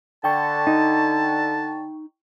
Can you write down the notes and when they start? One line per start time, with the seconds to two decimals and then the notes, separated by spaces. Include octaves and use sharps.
0.24 D3 G5 A5 C#6
0.67 D#4